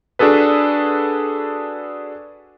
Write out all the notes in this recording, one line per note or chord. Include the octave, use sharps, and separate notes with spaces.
D4 F#4 G#4 A4 B4